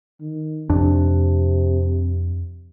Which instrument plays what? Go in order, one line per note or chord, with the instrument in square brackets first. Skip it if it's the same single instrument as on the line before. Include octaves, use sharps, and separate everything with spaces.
[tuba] D#3
[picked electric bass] F2 D4 [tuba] C3